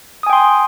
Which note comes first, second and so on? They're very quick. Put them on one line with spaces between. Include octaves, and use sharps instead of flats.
D#6 G#5 G5 C6